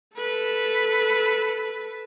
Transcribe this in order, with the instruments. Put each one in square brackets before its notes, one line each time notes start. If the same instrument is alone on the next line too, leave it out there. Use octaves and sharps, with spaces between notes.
[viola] A4 B4